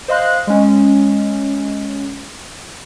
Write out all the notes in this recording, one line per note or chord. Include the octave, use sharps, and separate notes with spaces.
C5 D#5 F5 C6 F#6
G#3 C#4